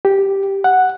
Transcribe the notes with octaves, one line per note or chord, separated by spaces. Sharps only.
G4
F#5